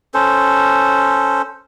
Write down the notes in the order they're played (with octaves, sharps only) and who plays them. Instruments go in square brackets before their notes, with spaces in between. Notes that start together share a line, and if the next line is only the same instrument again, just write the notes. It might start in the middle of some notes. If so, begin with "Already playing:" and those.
[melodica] C#4 A4 C5